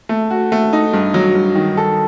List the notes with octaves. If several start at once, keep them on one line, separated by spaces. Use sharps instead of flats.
A3
F#4
A3
D#4
G2
F#3
G2
D#3
A4